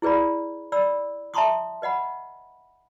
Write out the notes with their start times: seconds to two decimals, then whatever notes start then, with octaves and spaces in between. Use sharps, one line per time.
0.02 E4 G#4 B4 D5 B5
0.72 D5 B5 E6
1.34 E5 A5 A#5 C6 C#6 D#6
1.82 B4 D#5 F#5 B5